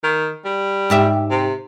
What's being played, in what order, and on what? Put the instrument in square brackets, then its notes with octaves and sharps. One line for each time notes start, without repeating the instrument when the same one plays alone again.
[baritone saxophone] D#3
G3
[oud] G#2 G4 E5
[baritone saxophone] C3